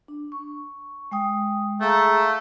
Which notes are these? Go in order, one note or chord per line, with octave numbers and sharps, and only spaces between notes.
D4
C#6
G#3 G5 D#6
A3 G#4 F5 A#5